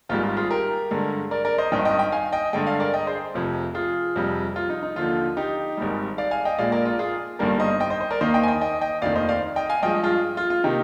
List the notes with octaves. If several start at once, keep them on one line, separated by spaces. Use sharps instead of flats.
G#1 G#2 G3 F4
F4
F4 G#4
G4 A#4
G2 D3 G#3
A#4 D5
A#4 D5
C5 D#5
G#1 G2 D#3 D#5 G5
D#5 G5
D#5 G5
F5 G#5
D#5 G5
G2 D3 G#3 D#5 G5
D5 F5
A#4 D5
D#5 G5
G#4 C5
F1 F2 C3
F4 G#4
F2 C3 G3
F4
D#4
D#4
D#2 D3 F3 F4
D#4 G4
G#1 G#2 G3
D5 F5
F5 G#5
D#5 G5
A#1 A#2 G#3 D5 F5
A#4 D5
F4
F4 G#4
G1 G2 D#3 G3 A#3 A#4 D5
C5 D#5
D#5 G5
C5 D#5
C5 D#5
A#4 D5
D#2 D#3 A#3 C5 D#5
D#5 G5
G#5
D#5 G5
D#5 G5
D#5 G5
F1 D#2 D#3 D5 F5
C5 D#5
D5 F5
D#5 G5
F5 G#5
G2 F3 G#3 D#5 G5
F4 G#4
F4
F4
C3 D#3 A#3 D#4 G4